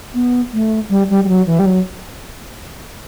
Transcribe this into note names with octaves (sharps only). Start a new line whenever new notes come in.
B3
A3
G3
G3
G3
F#3
E3
G3
F#3